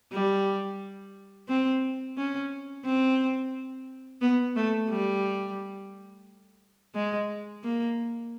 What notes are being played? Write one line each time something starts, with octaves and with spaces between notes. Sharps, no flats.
G3
C4
C#4
C4
B3
A3
G3
G#3
A#3